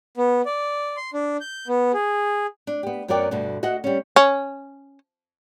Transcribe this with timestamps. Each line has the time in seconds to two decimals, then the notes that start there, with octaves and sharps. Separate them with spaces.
0.17 B3
0.46 D5
0.97 C6
1.14 D4
1.41 G6
1.68 B3
1.93 G#4
2.67 D4
2.83 B3 G4
3.08 F#2 F#3 B3 A#4 D5 G5
3.31 D2 G2 B2 D3
3.63 F#4 D#5 E5 F#5
3.84 G3 C#4
4.16 C#4